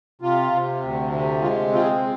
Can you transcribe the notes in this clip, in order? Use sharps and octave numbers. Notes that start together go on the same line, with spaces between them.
C3 F4
C3
D2
C3
G#3 F4
C4 F4
G#4